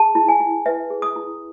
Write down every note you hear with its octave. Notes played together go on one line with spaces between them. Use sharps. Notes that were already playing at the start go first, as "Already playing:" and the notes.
Already playing: G#4 A5
E4
G#5
E4
B4 E5
G#4
D#6
E4